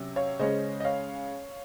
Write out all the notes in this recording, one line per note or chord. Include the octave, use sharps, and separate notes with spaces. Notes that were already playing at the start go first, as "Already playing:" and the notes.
Already playing: C3 F#3 C#4
C#5 F5
C#3 G#3 C#4 C5 D#5
D#5
C#5 F5